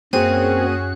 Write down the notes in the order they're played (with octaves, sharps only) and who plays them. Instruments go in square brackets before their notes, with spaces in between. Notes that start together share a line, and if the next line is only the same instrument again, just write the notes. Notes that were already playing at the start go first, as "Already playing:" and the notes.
[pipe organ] F#2 F#6 [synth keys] A#3 D#7 [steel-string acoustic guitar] C4 [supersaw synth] C#4 F#4 G#4